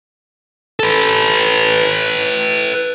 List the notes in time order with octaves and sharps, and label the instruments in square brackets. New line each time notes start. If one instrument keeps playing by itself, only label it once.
[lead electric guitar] A4 B4